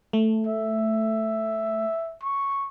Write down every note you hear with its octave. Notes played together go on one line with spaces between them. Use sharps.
A3
E5
C#6